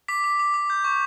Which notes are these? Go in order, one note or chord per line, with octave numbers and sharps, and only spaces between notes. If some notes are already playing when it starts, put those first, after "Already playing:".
D6 B6
D6
D6
D6
G6
C#6